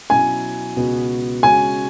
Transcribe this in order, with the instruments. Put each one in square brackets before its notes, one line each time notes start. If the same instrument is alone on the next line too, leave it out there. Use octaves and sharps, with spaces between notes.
[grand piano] B2 F#3 C#4 E4 [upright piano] G#5
[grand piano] C#2 B2 B3 F#4
[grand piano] C#3 G#3 C#4 F#4 [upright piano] G#5